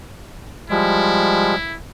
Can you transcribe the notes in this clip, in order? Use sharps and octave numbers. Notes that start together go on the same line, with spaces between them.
F3 G3 G#3 E4